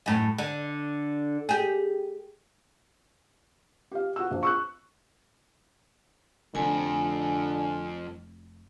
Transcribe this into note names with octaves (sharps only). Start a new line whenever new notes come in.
F#2 A2
D3
G4 G#4
G4 F5
F#4 E6
A#1
C#6 E6 F#6
F1 F2 D3 F4 G#5